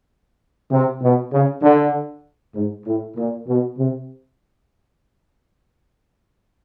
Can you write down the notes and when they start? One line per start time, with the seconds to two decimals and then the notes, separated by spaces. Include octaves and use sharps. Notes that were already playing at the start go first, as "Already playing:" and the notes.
0.71 C3
1.01 B2
1.32 C#3
1.62 D3
2.54 G#2
2.85 A2
3.16 A#2
3.47 B2
3.78 C3